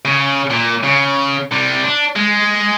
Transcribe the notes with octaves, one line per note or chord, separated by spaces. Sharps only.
C#3
A#2
C#3
C3 G3
D4
G#3